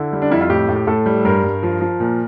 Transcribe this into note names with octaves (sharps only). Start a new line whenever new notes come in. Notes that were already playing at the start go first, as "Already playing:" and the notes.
Already playing: D3 E4
G3
D4
F2 E4
F4
A2 G4
A2
G4
A2 A4
G3
G2 A#4
G2
F3
F3
A#2